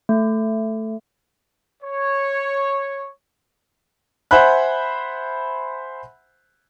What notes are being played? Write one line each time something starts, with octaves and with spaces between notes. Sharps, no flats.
A3
C#5
C5 E5 F#5 G#5 B5 F#6